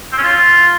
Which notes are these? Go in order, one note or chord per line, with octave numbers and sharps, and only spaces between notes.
C4
C#4
F4